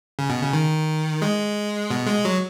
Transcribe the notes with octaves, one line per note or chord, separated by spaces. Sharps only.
C#3
B2
C#3
D#3
G#3
B2
G#3
F#3